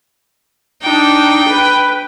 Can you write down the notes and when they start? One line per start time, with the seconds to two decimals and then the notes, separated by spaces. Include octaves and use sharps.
0.82 D4 D#4 G5
1.48 B4